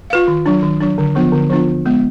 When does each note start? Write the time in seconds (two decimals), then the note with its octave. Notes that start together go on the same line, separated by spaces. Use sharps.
0.10 F4 B4 F5
0.28 D#3
0.46 F#3 D4
0.63 D#3
0.80 F#3 D4
0.98 D3
1.15 F3 B3 D4 F4
1.32 D3
1.50 F3 B3 D4 F4
1.67 D3
1.85 G#3 B3